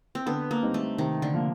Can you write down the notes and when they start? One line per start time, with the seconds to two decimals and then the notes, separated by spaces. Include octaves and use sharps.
0.15 C4
0.26 D3 B3
0.51 A#3
0.63 G3 C4 D#4
0.74 A3
0.98 C3 D#3
1.22 D3
1.34 F3 A#3